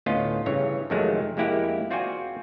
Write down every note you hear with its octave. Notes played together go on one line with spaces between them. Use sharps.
D2 A2 B3 C#4 F4 D#5
G2 C#3 E3 C#5
F2 C3 D#3 F#3 G#3 A3
F2 G#3 A#3 E4 G4 F#5
C4 F4 F#4 D5 G5 G#5